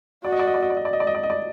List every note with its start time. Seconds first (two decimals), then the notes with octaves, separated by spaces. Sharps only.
0.24 F#4 D5
0.32 D#5
0.39 D5
0.47 D#5
0.54 D5
0.62 D#5
0.70 D5
0.77 D#5
0.85 D5
0.93 D#5
1.00 D5
1.07 D#5
1.15 D5
1.23 D#5
1.30 D5